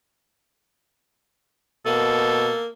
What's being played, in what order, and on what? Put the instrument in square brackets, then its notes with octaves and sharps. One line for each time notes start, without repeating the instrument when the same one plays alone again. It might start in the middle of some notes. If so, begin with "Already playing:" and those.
[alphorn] B2 [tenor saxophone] A#3 [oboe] A4